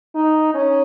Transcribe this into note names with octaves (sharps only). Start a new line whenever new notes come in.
D#4
C#4